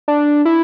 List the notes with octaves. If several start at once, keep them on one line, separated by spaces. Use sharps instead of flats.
D4
E4